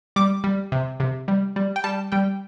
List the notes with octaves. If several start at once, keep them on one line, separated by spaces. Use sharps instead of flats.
G3 D6
G3
C3
C3
G3
G3
G5
G3 A5
G3 G5